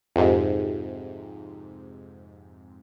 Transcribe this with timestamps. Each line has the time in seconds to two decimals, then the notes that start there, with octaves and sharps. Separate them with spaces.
0.16 F2 G#2 C3